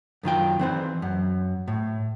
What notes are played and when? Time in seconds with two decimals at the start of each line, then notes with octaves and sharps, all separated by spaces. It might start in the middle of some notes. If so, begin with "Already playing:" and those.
0.23 F#2 D#3 F4 G5
0.59 E3 C4 C5
1.02 F#2
1.68 A2